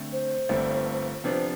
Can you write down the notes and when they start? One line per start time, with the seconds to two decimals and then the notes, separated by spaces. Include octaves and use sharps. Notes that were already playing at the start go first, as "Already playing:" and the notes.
Already playing: D3 A3 C4
0.12 C5
0.49 G1 G2 D3 A3 C4
1.24 C3 F3 B3 D4 C5